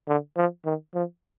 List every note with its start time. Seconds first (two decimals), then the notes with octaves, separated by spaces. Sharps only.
0.08 D3
0.37 F3
0.65 D#3
0.94 F3